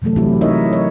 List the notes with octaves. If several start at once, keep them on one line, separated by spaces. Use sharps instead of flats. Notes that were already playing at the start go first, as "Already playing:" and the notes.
C3 E3 F#3 A3 A4
F#3 C4 E4 F#4 G4
D#4 E4 A#4 C#5 D#5 E5
C#5